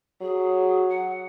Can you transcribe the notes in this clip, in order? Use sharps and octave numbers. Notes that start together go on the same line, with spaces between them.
F#3 G#4
F#5